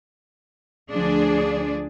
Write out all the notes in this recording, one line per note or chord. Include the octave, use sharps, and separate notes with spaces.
D2 F3 D4 G#4 D5